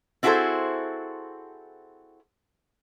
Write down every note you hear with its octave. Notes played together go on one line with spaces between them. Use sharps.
C4 E4 F#4 G#4 A4 C5